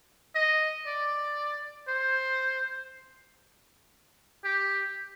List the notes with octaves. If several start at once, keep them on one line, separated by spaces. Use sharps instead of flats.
D#5
D5
C5
G4